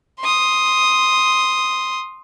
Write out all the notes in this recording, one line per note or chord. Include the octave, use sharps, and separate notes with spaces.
C6 D#6